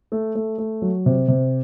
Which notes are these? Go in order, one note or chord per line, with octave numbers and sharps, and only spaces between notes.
A3
A3
A3
F#3
C3
C3